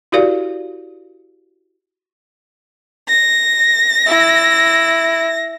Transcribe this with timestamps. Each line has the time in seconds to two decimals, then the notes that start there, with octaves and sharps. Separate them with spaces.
0.12 E4 F#4 G4 A#4 D5 F5
3.09 A#6
4.06 E4